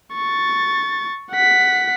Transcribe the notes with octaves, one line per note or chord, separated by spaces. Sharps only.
C#6 A6
F#5 B6